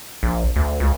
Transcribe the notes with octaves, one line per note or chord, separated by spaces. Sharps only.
A#1
D2
C#2